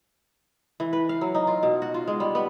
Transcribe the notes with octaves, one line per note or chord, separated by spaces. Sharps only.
E3
B4
F5
F#3
D#4
F4
B2
F#4
F4
G#3
G3
B3